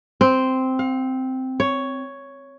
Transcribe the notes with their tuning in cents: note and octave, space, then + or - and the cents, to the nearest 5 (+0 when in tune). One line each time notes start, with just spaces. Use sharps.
C4 -5
F5 +35
C#5 +5